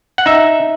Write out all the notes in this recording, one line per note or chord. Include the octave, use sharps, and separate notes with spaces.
F#5
D#4 E5